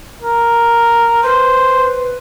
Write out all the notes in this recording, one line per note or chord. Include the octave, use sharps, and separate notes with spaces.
A#4
B4 C5